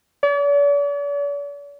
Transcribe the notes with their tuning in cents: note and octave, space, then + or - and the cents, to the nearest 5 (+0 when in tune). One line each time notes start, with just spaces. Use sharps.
D5 -45